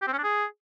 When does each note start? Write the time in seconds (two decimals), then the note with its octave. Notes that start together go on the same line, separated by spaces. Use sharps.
0.02 G4
0.07 C4
0.13 C#4
0.18 D4
0.24 G#4